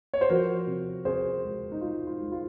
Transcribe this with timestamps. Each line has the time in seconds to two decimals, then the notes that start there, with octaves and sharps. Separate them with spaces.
0.14 C#5
0.21 C5
0.30 F3 F#4 A#4
0.67 C3
1.05 C3 G#4 C5
1.44 G#3
1.72 D#4
1.81 G#3 F4
2.07 F4
2.20 G#3
2.32 F4